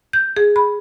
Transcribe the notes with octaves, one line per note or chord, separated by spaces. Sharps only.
G6
G#4
B5